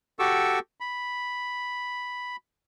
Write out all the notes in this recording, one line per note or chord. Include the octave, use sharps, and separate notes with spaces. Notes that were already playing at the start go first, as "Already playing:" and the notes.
F#4 G4 A4 C#6 D6 E6
B5